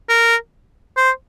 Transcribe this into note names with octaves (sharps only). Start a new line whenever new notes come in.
A#4
C5